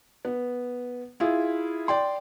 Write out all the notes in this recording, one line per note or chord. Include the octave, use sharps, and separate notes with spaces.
B3
E4 F4 G#4
D5 G5 C6